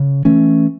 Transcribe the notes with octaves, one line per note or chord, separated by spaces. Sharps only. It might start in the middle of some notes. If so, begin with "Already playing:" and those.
Already playing: C#3
E3 A3 C#4